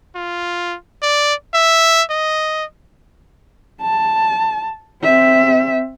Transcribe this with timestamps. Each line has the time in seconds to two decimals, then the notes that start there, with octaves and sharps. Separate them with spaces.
0.15 F4
1.02 D5
1.54 E5
2.10 D#5
3.82 A5
5.02 C4 E5